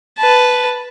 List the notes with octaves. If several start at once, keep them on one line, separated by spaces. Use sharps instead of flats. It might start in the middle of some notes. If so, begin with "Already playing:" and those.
B4 A5